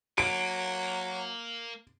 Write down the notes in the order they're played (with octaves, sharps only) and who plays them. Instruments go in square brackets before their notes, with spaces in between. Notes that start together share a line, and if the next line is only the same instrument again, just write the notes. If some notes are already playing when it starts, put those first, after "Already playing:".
[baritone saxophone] F#3 [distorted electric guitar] A#3 [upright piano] D7